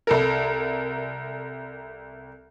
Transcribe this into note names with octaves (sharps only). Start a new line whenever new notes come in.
C2 A4 A#4